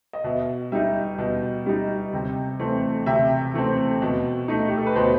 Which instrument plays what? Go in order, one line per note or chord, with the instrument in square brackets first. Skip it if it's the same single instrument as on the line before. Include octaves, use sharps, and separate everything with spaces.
[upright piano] D#5
[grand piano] B2 [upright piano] E5
[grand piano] G3 D#4 [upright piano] E5
[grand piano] B2
G3 D#4
C3
E3 A3 C4
[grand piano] C3 [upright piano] E5
[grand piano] E3 A3 C4
B2
A3 D#4
[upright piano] G4
A4
B4
[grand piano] B2 [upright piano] C5